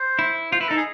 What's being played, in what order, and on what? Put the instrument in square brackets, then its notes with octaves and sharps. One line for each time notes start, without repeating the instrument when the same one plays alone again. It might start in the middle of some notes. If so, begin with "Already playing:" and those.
Already playing: [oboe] C5
[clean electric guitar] E4
[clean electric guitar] F4 [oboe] C5
[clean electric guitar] E4 [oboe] B4
[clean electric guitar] D#4 [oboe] A4
[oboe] G#4